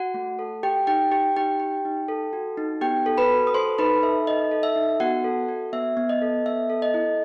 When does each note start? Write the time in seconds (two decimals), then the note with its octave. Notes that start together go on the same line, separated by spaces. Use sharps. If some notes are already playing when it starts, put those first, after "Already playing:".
Already playing: F#4 F#5
0.14 A3
0.39 A4
0.63 G4 G5
0.87 D#4 G4 G5
1.11 G4 G5
1.36 D#4 G4 G5
1.60 G4
1.85 D#4
2.08 A4
2.33 F#4
2.57 D#4
2.81 B3 G4 G5
3.06 A4
3.18 B4 B5
3.30 F#4
3.47 D#6
3.54 A4 C5 C6
3.78 D#4 B4 B5
4.03 A4 E5
4.27 D#4 D#5
4.51 A4
4.63 E5
4.76 D#4
5.00 B3 F#4 F#5
5.24 A4
5.48 F#4
5.73 B3 E5
5.97 B3
6.09 D#5
6.22 A4
6.46 B3 E5
6.70 A4
6.82 D#5
6.94 E4